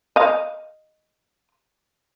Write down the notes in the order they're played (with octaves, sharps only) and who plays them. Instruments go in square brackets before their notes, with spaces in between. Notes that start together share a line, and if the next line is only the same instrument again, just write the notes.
[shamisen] D#5 F5